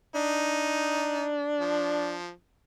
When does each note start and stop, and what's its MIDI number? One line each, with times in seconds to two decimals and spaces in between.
0.15 2.17 62
0.15 1.29 63
1.60 2.30 53